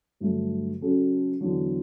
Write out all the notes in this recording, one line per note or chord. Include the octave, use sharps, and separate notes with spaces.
G2 D3 F#3 A3
C#3 F#3 C#4 F#4 A4
E2 D3 F#3